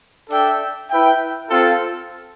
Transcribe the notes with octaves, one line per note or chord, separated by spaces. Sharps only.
D4 A4 E5 G5
E4 B4 E5 G5
C4 F4 A4